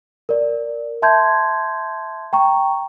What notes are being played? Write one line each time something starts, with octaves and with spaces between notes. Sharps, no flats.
A#4 D5
E5 A5 C6 G6 G#6
G5 A#5 C#6